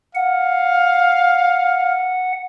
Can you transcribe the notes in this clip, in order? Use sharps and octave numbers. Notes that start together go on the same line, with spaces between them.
F5 F#5